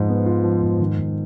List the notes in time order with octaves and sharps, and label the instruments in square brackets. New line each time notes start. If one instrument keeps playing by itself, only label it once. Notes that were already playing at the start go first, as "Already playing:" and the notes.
Already playing: [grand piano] G#2 F3
B3
F4
F3
G#2
D#3
G#2